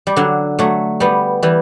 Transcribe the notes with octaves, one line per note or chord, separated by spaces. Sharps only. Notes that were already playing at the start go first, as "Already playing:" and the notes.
G3
D3 F#3
F#3 A3
G3 B3
E3 G3